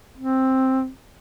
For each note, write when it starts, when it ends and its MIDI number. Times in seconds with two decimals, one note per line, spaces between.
0.18 0.89 60